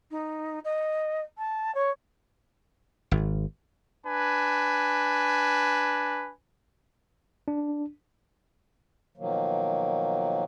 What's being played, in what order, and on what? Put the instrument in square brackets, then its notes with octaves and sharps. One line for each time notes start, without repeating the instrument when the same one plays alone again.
[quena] D#4
D#5
A5
C#5
[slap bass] G#1
[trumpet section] D4 B4 G#5
[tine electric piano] D4
[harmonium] B2 D#3 F3 F#3 A#3